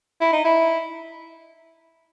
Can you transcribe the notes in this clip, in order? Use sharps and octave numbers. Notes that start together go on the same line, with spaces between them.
E4
D#4
E4